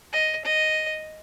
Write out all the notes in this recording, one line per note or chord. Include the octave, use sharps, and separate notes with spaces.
D#5
D#5